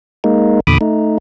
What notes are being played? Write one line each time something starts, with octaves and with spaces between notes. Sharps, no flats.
G#3 A#3 D#4
E2 A#2 D3 B5 D6 D#6
A3 D#4